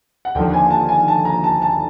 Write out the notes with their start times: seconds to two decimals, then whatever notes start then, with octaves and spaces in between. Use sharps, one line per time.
0.25 F#5
0.35 D#2 D3 F3 G5
0.53 G#5
0.70 A5
0.89 G#5
1.08 A5
1.25 A#5
1.44 A5
1.62 A5